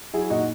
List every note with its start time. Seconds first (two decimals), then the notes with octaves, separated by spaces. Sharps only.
0.14 F#3 E4 G#4
0.30 A#2 D#4 F#4